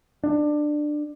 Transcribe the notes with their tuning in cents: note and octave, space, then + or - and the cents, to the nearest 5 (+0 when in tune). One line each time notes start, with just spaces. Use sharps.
D4 +20